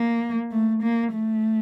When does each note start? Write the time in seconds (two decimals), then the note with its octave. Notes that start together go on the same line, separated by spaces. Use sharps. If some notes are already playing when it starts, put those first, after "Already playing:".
Already playing: A#3
0.52 A3
0.83 A#3
1.13 A3